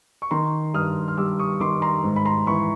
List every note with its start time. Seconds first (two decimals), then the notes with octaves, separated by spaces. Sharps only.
0.22 C#6
0.31 D#3 A#5 C6
0.74 G2 D#6 F6
1.08 F6
1.17 G3 D6 E6
1.39 C#6 D#6
1.60 D#3 C6 D6
1.82 A#5 C6
2.04 G#2
2.16 B5
2.25 A#5 C6
2.47 E3 B5 C#6